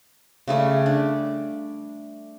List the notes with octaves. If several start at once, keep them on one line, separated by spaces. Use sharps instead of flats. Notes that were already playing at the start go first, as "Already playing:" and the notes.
C#3 G3 A3
D4